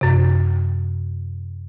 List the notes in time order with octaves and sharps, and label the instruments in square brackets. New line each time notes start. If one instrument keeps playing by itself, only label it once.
[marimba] F#2 C3